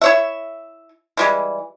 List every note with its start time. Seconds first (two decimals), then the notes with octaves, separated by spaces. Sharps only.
0.02 E4 C#5 E5
1.17 E3 G3 G#3